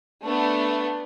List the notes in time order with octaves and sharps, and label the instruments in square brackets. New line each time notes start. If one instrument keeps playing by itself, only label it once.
[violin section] A3 B3 D4